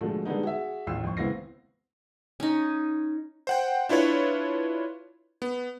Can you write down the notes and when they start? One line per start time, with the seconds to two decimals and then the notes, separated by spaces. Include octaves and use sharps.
0.01 B2 D3 F3 G#3 A3
0.25 D3 G3 G#3 B3 D#4
0.43 F#4 G#4 E5
0.87 A1 D#2 F4 E6 C7
1.04 F2 C#6
1.17 C#2 B3 C4 E4 A#6 C7
2.40 C#4 D#4
3.47 C5 F#5 G5
3.89 D4 E4 F4 B4 C#5
5.42 B3